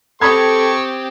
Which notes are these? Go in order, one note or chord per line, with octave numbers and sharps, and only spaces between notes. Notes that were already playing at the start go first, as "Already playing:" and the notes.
C4 G4 A4 B5 C#6 D#6 G#6